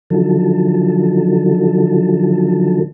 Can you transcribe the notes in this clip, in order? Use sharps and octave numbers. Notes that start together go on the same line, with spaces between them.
D3 D#3 F3 F#3 A4